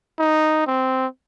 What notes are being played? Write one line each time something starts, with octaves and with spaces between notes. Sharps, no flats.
D#4
C4